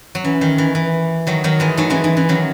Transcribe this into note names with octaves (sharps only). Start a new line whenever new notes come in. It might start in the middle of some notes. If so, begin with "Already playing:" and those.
F#3
E3 C#4
D#3
E3
E3
D#3 F#3
D#3 F#3
E3 G#3
F#3 A3 D#4
E3 G#3 C#4
E3 D#4
E3 C#4
D#3 F#3 C#4